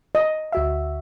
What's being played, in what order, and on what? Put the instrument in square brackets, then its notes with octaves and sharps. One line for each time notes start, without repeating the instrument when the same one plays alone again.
[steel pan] D#5
[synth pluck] D2 F#4 E5